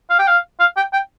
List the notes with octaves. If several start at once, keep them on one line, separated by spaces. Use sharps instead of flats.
F5
G5
F5
F5
G5
G5